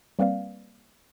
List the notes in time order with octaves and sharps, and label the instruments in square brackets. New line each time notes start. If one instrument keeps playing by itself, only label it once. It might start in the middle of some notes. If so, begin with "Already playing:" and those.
[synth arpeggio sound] G3 A#3 C4 B4 D5 F5